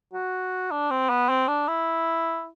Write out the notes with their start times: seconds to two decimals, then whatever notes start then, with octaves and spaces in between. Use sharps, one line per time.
0.13 F#4
0.71 D4
0.90 C4
1.09 B3
1.29 C4
1.48 D4
1.68 E4